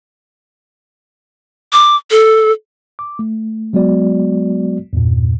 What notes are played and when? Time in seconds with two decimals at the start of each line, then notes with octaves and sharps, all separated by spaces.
1.73 D6
2.11 A4
2.99 D6
3.19 A3
3.73 F#3 G#3 B3 F#4 D5
4.93 E2 G2 A#2